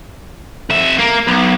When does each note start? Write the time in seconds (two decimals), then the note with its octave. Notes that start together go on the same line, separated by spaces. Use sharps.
0.70 F2 E5
0.99 A#3
1.27 B1